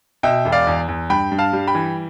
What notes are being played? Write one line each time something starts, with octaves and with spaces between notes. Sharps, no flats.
B2 E5 G5
E1
D5 F5
E2
E2
G2 G5 B5
G2
F5 A5
G3
G5 B5
E3